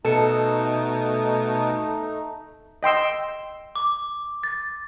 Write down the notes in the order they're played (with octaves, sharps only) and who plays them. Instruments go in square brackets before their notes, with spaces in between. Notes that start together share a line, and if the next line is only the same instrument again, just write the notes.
[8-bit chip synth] B2 [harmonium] A3 D#4 [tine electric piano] A4 [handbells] A5 C#7
[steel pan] D#5 G5 C6 E6
[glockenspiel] D6
A6